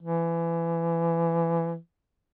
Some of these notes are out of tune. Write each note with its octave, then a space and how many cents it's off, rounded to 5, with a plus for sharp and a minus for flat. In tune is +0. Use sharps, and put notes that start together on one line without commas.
E3 +25